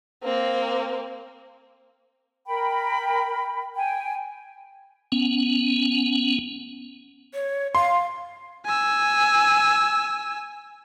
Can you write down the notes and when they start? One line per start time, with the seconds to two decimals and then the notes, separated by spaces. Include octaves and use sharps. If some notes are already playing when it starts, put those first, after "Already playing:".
0.23 A#3 C4
2.47 A#4 G5 B5
3.75 G5 G#5
5.12 B3 C#4
7.34 C#5
7.75 F5 C6
8.66 G#5 E6